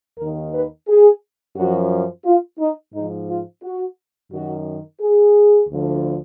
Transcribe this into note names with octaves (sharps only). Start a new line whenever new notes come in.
D#2 D#3 A#4
B4
G#4
F#2 F3 F#4
F4
D#4
G#2 F3 D#4
F4
F#4
F#2 D#3 F#4
G#4
D2 D3 F3